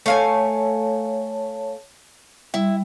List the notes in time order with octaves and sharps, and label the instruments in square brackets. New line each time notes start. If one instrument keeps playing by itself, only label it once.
[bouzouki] A3 F5 G#5 [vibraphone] C#5 A5
[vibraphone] G3 [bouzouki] E4